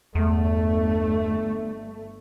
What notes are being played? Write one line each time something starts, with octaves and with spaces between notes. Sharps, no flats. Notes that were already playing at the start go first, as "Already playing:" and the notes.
G1 E2 A3